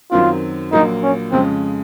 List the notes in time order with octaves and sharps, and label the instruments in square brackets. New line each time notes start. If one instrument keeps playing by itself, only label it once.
[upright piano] F#2 D#3 F#3 C4 [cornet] F4
[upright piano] A#1 A#2 F#3 A#3 [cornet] D#4
[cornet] C#4
[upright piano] F2 C#3 G#3 C#4 [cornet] C4